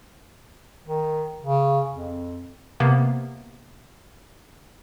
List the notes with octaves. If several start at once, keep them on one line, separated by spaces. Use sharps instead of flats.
D#3
C#3
F2
C3 A#3 B3